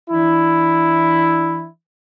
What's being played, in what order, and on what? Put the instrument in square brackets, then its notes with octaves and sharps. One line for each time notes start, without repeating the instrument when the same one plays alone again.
[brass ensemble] E3 D4 E4